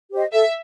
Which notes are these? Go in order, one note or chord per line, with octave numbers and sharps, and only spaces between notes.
G4 C5 D#5
A4 E5